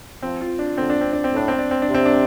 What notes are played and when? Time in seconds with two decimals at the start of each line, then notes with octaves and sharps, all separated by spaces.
0.23 F3 C4
0.41 F4
0.59 D4
0.77 D3 C4
0.90 D4
1.01 C4
1.13 D4
1.24 C4
1.33 A2 D4
1.48 C4
1.58 D4
1.71 C4
1.82 D4
1.89 C3
1.94 C4
2.05 D4